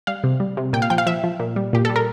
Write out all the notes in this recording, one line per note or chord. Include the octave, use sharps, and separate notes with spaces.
G3 F5
C3
G3
C3
A#2 G5
F5
F3 G5
F5
F3 E5
F3
A#2
G3
A#2 G4
G3 A4
A#4